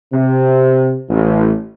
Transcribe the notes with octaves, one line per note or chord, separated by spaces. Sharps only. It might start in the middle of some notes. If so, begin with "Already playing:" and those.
C3
A1